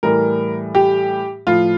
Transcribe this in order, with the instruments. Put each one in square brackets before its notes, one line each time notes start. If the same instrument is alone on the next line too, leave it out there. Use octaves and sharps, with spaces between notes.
[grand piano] A2 E3 G3 A#4
G4
A2 F3 F4